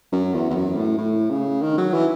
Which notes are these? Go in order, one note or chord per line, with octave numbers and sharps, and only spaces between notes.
F#2
E2
E2
F#2
A2
A2
C#3
D#3
F#3
E3